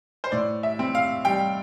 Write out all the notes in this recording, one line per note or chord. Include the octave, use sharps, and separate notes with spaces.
C5
A2 D5
E5
C4
F5
G3 G5